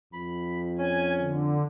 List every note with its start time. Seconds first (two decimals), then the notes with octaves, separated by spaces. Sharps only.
0.13 F2 B5
0.79 C#4 G#5
1.19 D3